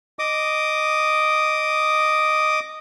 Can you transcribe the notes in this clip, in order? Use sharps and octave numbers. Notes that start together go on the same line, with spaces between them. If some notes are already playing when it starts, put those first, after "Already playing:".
D#5 D6 D#6